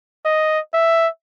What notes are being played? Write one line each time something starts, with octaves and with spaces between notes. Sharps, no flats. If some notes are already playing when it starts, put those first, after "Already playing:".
D#5
E5